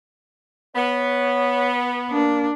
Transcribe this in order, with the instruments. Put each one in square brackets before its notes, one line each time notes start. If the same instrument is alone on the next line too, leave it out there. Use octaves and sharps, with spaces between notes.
[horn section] B3 [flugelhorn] C#5
[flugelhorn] A#3 [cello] D4